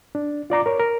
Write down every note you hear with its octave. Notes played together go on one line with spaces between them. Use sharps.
D4
F4 D5 A#5 D6
A#4 C#5
A#4